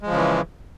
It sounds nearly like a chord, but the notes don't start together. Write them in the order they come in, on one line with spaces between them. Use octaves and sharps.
G#3 F3 C#3 E3